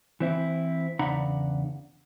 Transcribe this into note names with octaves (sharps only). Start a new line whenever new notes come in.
E3 C4 E4
E2 C#3 D4 F#5 A#5 B5